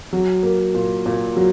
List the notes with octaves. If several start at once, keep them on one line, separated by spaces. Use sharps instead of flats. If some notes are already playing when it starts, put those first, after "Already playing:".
F#3
A#3
A#2
A#2
F#3